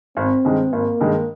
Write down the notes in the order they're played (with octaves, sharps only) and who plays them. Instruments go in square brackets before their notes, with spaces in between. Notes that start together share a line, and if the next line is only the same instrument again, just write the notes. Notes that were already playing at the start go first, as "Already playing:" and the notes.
[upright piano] G#1 [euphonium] C4
[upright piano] G2 D#3 G#3
[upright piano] G#1 [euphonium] A#3
[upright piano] G2 D#3 G#3